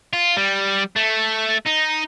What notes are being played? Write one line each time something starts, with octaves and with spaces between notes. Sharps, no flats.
F4
G3
A3
D#4